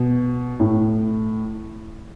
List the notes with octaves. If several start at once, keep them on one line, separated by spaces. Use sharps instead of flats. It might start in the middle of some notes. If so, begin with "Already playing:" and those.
Already playing: B2
A2